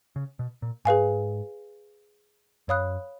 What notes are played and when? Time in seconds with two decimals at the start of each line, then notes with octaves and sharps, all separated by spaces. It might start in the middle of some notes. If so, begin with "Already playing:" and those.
0.16 C#3
0.39 B2
0.62 A#2
0.85 G#2 G#4 B4 F5 G#5
2.68 F#2 C#5 F5 B5 D#6 F#6